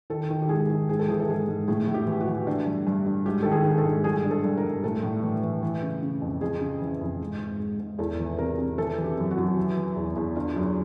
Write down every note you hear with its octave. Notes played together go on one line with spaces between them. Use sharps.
D#3 A4
D#3
G4
G#2 G#4
D#3
G#2 G#4
A4
E3 G#4
A4
G#2 G#4
G#2
A2 G#4
A2
G4
E3
F#4
E3
D3
G2
G2
D3
G#2 G4
D#3 A4
G#4
D#3
A4
G#2
G2 G#4
D3
A4
G2
A#4
G2
A2 A4
A2
E3
E3
E3
C#3
C#3
F2
F2 G#4
C#3
E3
F2
G#2
G#2
G#2
G#2
E2 A4
E3
C3 A#4
C3
E3 A4
E3
G4
F#2
F#4
F#2
E3
E3
E2
E2
D3 F4
F#2